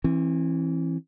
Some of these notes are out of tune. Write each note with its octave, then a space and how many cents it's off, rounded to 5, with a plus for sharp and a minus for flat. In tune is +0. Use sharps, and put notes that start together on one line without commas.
E3 +0 C4 +40